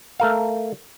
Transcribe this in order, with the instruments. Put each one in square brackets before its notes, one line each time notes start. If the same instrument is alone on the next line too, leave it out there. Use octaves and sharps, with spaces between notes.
[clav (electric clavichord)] A3 A#4 F5